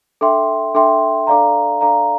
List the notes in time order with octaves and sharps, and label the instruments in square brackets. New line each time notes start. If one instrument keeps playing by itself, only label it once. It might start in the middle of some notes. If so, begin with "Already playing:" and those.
[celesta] D4 A4 E5 G5 C6
D4 A4 E5 G5 C6
D4 A4 D5 F5 A#5
D4 A4 D5 F5 A#5